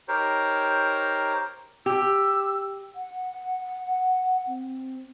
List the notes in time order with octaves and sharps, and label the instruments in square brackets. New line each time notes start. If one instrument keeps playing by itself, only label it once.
[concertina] D#4 G4 A#4 C5 C#5
[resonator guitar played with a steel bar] G4 [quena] E6
[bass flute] F#5
C4